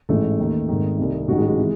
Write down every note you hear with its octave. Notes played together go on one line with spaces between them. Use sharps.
A1 G#2 E3 A3
D#2 D#3
G#1 G#2 D#3
C2 C3 D#3
A1 G#2 D#3 F#4
G#3
G#3
C3 E3